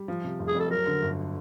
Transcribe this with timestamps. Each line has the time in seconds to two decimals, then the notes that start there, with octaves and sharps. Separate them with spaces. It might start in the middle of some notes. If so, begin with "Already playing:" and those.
Already playing: G3
0.08 F3
0.24 C3
0.39 F1
0.48 G#4
0.55 F2 A4
0.70 F#3 A#4
0.86 D3
1.02 G1